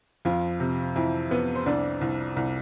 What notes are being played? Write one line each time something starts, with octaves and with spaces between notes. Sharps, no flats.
F2 F3 F4
C3
F2 E3 E4
F2 B3 B4
C5
C2 D4 D5
C2
C2